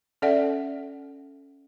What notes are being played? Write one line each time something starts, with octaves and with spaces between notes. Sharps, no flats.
C#4 A4 D5 E5 F#5